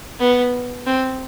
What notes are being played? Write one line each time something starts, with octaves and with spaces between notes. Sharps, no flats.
B3
C4